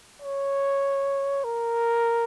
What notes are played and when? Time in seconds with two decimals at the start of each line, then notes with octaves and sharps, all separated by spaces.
0.22 C#5
1.44 A#4